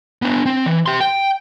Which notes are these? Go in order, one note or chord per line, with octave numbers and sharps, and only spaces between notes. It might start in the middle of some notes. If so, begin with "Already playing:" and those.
B3 D4
C4
E3
G4 C6
G5